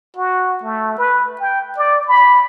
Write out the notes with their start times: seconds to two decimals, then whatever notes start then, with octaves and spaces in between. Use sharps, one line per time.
0.17 F#4
0.63 A3
0.98 B4
1.40 G5
1.77 D5
2.07 B5